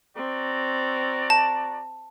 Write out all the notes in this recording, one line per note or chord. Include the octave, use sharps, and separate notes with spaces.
C4 F#4 D5 A#5
A5